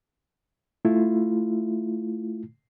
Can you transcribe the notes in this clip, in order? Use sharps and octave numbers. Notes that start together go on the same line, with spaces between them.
A3 E4 F4